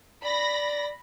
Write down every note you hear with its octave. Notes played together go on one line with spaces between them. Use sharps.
D5 B5 A#6